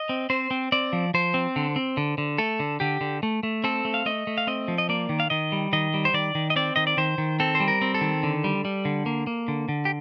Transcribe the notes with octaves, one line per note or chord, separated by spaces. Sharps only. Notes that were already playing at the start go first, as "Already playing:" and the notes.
Already playing: D#5
C4
C4 C5
C4
C4 D5
F3
F3 C5
C4
D3
C4
D3
D3
A3 A4
D3
D3 G4
D3
A3
A3
C4 A4
A3
F5
A3 D#5
A3
F5
C4 D#5
F3
D#5
A#3 D5
D#3
F5
D#3 D#5
G3
D#3 D#5
G3
C5
D#3 D5
D#3
D#5
C4 D5
D#3 D#5
D5
D#3 C5
D#3
C4 A4
C5
G3
A#4
C4
A4
D#3
D3
G3
G3
D3
A#3
A#3
D3
D3
G4